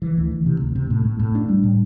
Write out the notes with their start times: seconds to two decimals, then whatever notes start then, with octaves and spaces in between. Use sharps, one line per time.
0.02 E3
0.17 D2
0.32 E3
0.46 C3
0.61 D2
0.75 C3
0.90 A2
1.05 A2
1.19 A2
1.35 D4
1.49 G3
1.63 A2